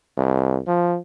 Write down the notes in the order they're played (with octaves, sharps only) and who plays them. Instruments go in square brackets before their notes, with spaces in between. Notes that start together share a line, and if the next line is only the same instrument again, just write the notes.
[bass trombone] C2
F3